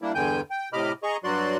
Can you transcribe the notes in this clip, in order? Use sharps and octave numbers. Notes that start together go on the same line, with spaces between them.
G3 A#3 D4 E4
E2 G2 D3 G5 G#5 G6
G5
A2 C3 D#5 B5 D6 F6
G#4 D#5 A#5 C#6
G2 F#3 F#4 D5 C6 F#6